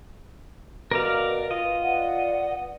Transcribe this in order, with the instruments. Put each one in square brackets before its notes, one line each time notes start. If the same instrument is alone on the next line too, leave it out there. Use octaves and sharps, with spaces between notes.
[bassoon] B2 [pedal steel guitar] A#4 D5 F5 [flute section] B4
[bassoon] F4 [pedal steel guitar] D#5
[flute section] B4 D5 F#5